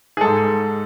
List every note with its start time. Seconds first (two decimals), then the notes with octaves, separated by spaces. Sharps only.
0.17 G#4
0.21 G#2 G#3 A4